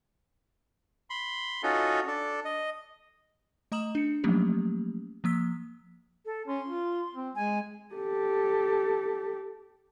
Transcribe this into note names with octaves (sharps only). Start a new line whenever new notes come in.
B5 C6
C#4 D#4 F4 F#4 A4
D4 A4
D#5
A3 D#5 A#5 D#6 E7 F#7
D4 C#7
F3 F#3 A3 A#3 C#4 G4
F3 A#3 E6 B6
A4
C#4 C6
F4
C4
G#3 G#5
G4 A4